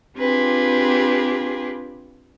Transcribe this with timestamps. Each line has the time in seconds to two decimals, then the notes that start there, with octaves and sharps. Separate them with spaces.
0.17 C4 D4 F4 G4 G#4 B4